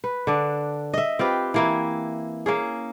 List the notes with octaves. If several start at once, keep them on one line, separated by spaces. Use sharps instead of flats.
B4
D3 D4
D#5 E5
C4 F4 G4 B4
E3 A#3 E4
A#3 C#4 G#4